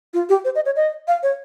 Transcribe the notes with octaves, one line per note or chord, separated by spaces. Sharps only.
F4
G4
C5
D#5
C#5
D#5
F5
C#5